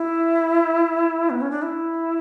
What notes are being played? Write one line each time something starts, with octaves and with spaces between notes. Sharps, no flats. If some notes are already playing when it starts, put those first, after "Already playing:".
Already playing: E4
B3
C#4
D4
E4